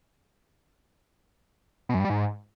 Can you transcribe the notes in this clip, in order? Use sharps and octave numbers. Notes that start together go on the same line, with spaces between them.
B2
F#2
G2
G3
G#2